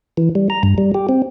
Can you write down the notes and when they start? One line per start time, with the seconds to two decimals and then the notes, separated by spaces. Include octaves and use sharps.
0.17 E3
0.35 G3
0.50 A#5
0.63 G2
0.78 G3
0.94 G4
1.09 C4